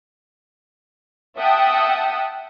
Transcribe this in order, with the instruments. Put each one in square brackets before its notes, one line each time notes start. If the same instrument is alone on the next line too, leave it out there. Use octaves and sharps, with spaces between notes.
[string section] E5 F#5 G5 A5 D#6